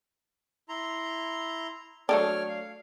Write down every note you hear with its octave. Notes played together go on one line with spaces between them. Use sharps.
E4 A#5 C6
F#3 A3 D4 C#5 F6
F5